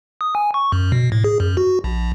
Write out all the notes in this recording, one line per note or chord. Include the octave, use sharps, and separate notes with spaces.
D#6
G#5
C#6
F#2
B2
A2
G#4
F#2
F#4
A#1